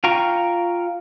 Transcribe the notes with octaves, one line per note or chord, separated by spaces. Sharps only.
F4 F5 G5 A#5 C#6